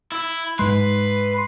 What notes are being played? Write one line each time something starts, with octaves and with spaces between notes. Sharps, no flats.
E4
G#2 G#3 B4 C6